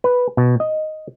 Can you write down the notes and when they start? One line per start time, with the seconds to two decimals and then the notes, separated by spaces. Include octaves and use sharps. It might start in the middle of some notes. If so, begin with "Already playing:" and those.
0.04 B4
0.37 B2
0.60 D#5